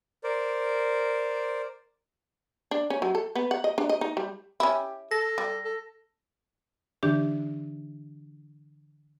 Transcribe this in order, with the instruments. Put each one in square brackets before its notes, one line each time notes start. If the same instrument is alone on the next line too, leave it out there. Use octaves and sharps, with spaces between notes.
[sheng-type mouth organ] A#4 C5 D5
[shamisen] D4
C#4
F#3
A4
B3
F#5
D#5
D4
D#5
D#4
G3
[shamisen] C#4 E4 [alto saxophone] G4
[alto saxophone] A4 [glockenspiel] A#6
[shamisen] G3
[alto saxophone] A4
[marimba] D3 E3 D4 G4 G6